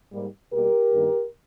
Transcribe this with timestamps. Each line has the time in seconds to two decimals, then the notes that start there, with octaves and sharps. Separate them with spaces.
0.12 G#2 G3 A#3
0.52 B2 G3 A#3 G4 A#4
0.93 G2 D#3 A#3